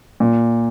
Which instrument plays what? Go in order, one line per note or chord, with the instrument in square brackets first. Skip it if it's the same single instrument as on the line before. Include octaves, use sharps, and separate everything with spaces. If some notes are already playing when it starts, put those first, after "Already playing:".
[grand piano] A#2